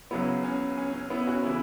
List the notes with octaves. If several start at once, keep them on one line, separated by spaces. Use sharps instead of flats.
C#2 C#3 F#3 B3 E4
C#4
C#4
C#4
B3 E4
C#4 F#4
C#3 E3 B3 E4